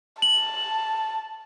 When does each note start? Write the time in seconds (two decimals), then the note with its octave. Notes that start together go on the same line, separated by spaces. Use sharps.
0.22 A5 F#7